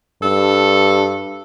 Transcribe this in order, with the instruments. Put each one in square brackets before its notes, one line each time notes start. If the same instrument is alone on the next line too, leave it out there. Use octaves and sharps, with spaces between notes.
[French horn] G2 [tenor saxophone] A4